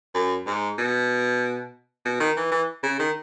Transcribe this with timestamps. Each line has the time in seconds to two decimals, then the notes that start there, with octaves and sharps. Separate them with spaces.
0.14 F#2
0.46 G#2
0.78 B2
2.05 B2
2.20 D#3
2.37 E3
2.51 E3
2.83 C#3
2.99 D#3